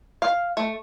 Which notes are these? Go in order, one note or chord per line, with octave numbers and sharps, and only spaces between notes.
F5
A3